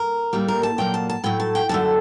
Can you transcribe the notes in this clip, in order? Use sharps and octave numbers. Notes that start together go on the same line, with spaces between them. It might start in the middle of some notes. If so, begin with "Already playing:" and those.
Already playing: A#4
A2 G3 A#3
A#4
A5
A#2 F#3 A#3 G5
A5
A5
A2 F#3 A3 G5
A5
G5
F#2 D3 A3 A5